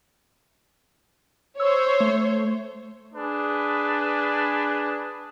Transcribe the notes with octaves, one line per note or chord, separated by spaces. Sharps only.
C5 C#5 E6
A3
D4 G#4 B4